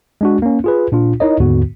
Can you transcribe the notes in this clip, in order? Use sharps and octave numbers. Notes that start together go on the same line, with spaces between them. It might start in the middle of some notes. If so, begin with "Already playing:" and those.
G#3 D4 F#4
A#3 C#4
F4 G#4 B4
A#2 D4 F4
D#4 E4 A#4 C#5 D#5
D#2 G#2 D3 B3 F#4